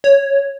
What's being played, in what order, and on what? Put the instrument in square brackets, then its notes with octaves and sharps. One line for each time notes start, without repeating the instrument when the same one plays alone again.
[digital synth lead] C#5